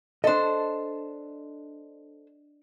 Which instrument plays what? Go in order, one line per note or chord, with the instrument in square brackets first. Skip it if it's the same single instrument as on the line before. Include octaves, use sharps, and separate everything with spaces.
[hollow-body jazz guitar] D4 D#5 [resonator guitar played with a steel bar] A4 C5